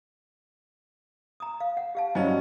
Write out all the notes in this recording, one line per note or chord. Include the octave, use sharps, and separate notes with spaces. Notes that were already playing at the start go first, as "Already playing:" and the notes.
A#5 D#6
F5
F#5
G4 F5 A5
G2 F#3 C#4 C5 D#5 G#5